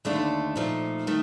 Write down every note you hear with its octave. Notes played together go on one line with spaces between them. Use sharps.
D#2 D3 A3 D4 A4
A#2 F3 A3 D#4
D#3 A3